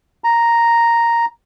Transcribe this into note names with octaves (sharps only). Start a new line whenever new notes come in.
A#5